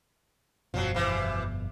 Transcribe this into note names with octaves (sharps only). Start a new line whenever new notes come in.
G1 F2 B2 F3 F#3
C3 E3